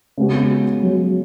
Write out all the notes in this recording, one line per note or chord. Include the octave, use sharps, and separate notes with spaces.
C#3 G#3 B3 F#4
F#3